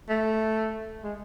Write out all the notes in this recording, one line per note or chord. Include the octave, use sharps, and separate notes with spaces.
A3
G#3